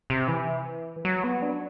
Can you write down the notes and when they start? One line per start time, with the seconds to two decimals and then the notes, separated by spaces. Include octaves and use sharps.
0.10 C3
0.28 E3
1.05 F#3
1.24 B3
1.42 D4